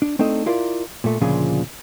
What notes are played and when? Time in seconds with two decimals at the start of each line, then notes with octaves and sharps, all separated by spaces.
0.02 D4
0.19 A3 C4 D4 D#4 A4 D#5
0.46 E4 F4 A#4 D5
1.04 A#2 A3
1.21 D2 A#2 C#3 F3 D4 G#4